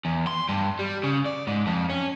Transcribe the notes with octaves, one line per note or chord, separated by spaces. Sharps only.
E2
C6
G2
G3
C#3
D5
G#2
F2
C#4